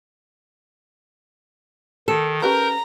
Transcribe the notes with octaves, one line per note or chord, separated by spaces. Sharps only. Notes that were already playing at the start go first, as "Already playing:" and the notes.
D#3 A4
C#4 G4 A#4 B4 A#5 G6